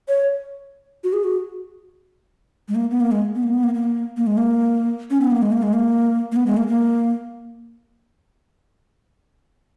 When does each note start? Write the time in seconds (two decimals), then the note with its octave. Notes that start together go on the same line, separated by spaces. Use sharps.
0.09 C#5
1.04 F#4
1.13 G#4
1.24 F#4
2.68 G#3
2.75 A#3
2.91 B3
3.01 A#3
3.12 G#3
3.35 B3
3.43 A#3
3.53 B3
3.64 A#3
3.74 A#3
4.17 A#3
4.27 G#3
4.37 A#3
5.10 C#4
5.21 B3
5.31 A#3
5.42 G#3
5.52 A#3
5.63 G#3
5.73 A#3
6.32 A#3
6.36 B3
6.46 G#3
6.57 A#3
6.67 A#3